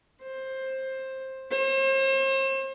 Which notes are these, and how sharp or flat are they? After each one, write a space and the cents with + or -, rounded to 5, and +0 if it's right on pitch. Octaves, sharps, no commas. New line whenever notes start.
C5 +15
C5 +40